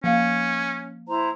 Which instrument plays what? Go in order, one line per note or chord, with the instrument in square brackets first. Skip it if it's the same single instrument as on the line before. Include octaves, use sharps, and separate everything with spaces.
[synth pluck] F3 [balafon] A#3 F5 [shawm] C#4
[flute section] E4 C5 A#5